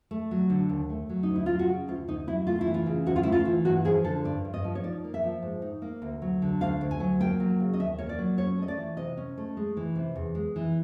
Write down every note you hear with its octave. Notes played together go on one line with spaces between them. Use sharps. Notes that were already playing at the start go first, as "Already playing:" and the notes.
A3
F#3
D3
D#2
A3
F#3
D#4
D2
E4
F#3 F4
F#4
C#3
D2 F4
D2 D#4
F#3 E4
A3 F4
E4
E3
F4
C#3
D2 F#4
F4
A3 E4
F4
E3
G2 F#4
F3 G#4
D3 A4
G2 D5
G2
D#5
F3
C#5
D#4 D5
A#3
E5
F3
G#2
D#4
A#3
D2
F#3
D3
D2 F5
D2
G#5
F#3
A#3 G5
F#3
C#3
D#5
D#2 E5
A#3 C#5
D5
F#3
C#4 C#5
A3 D#5
D5
E3
C3 D#5
C#4
A3
G#3
E3
C3
E2
G#3
E3